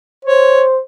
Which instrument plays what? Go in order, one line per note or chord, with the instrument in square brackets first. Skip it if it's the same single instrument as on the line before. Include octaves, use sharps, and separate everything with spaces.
[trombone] C5 [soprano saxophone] C#5